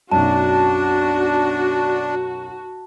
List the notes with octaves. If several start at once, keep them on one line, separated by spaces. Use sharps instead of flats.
B1 F#2 D4 F#4 A5